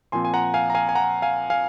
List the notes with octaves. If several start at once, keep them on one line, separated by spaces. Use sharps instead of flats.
A#2 F3 C4 G#5 C6
G#5
F#5 A#5
F5 G#5
A#5
F5 G#5
G#5
F#5 A#5
F5 G#5
F5 G#5